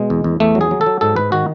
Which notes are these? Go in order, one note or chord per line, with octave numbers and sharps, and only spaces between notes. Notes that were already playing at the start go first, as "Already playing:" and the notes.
Already playing: B2 G#3
E2
E2
E2 A3
F#3
G#4
F#3
A4
F#3
G#2 A4
G#2 B4
D#3 F#4